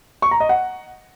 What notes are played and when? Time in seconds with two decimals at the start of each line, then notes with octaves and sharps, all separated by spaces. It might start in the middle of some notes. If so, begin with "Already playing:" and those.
0.22 C#6
0.31 A#5
0.40 D#5
0.49 F#5